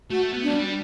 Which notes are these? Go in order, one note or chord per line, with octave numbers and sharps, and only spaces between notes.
A3 F#4
B3
A3 D4
G3